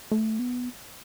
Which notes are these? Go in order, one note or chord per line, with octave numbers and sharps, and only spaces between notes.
A3
B3